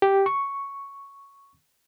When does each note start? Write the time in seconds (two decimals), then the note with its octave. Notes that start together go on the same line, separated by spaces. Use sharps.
0.02 G4
0.26 C#6